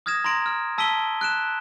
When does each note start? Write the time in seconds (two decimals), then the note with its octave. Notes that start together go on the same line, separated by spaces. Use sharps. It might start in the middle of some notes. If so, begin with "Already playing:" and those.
0.06 D#6 F6 G#6 A#6 E7
0.24 A#5 C6 A#6 D7
0.46 F6
0.78 A5 E6 B6 D7 D#7 G7
1.21 F#6 D7 E7